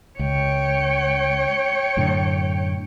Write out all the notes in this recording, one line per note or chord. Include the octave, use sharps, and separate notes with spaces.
C#2 C#5 G5
F#2 A2 D3